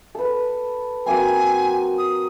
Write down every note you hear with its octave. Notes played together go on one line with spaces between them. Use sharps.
A4 B4
F#3 A#3 C4 G#5
D#6